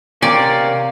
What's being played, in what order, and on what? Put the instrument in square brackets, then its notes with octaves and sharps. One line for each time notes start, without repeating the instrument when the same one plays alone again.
[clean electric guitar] C3 C4 C#4 [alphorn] A#3 [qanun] D5